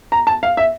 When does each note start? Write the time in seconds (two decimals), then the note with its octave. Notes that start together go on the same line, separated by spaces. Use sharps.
0.12 A#5
0.27 A5
0.43 F5
0.57 E5